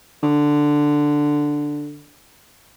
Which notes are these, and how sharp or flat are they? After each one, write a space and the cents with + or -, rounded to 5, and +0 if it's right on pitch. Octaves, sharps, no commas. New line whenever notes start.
D3 +5